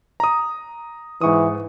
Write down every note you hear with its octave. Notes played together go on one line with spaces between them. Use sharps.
A#5 D#6
G#2 E3 C#6 D#6